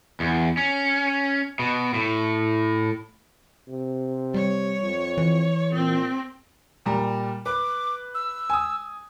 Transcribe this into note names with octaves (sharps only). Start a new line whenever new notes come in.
E2
C#4
B2
A2
C3
G3 C#5
F2
E3
A#2 C4
A#2 G3 A#5
B4 D6
E6
G#5 D#6